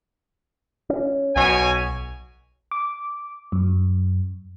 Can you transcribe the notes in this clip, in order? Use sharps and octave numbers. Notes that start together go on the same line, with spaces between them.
C#4
B1 B2 C#5 G#5
D6
F#2